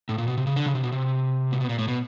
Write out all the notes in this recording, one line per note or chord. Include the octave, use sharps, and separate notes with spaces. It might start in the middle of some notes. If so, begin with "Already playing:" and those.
A2
A#2
B2
C3
C#3
D3
C#3
C3
B2
C3
A#2
B2
A#2
A2
B2